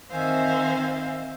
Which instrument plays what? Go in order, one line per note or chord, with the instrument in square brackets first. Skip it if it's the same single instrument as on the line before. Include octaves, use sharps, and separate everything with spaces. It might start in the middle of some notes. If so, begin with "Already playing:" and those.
[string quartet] D#3 C4 C5 E5 F5 G#5